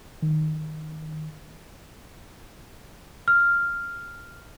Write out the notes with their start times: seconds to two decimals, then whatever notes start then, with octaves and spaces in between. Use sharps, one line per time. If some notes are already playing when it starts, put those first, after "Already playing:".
0.22 D#3
3.28 F6